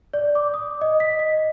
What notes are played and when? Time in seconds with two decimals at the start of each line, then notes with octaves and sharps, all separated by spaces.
0.14 D5
0.35 D6
0.54 D#6
0.81 D#5
1.00 B6
1.19 D#5